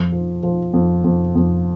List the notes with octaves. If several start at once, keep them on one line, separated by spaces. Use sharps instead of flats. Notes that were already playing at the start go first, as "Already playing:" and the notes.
Already playing: F2
F3
F3
F2
F2
F2